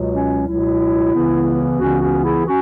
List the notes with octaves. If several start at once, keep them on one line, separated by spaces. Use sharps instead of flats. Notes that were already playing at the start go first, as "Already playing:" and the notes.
Already playing: C#2 B2 F#3
C#4
C#2 B2 F#3 E4
C#2 C#3 E3 B3
C#2 C#3 E3 B3 C#4 F#4
C#4 F#4
E4 G#4
C#4 F#4